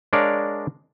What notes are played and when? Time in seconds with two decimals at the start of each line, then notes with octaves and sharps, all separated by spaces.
0.13 G#3 D4 A#4 C#5 D5 F5